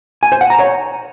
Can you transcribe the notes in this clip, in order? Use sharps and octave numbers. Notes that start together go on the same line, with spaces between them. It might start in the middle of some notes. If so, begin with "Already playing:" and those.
G#5
C5
F#5
A#5
C#5